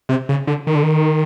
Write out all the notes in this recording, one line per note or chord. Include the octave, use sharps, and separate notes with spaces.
C3
C#3
D3
D#3
D3
D#3